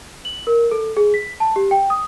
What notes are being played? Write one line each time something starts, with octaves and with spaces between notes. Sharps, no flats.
F#7
A#4
A4
G#4
B6
A5
G4
G5
D#6